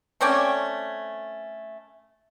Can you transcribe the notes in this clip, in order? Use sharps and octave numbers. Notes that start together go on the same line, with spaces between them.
A3 C4 C#4 D5